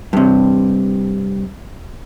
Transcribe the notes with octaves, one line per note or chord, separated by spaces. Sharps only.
G2 C3